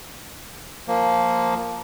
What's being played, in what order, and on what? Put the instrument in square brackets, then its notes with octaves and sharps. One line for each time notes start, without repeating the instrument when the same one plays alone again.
[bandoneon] F3 A#3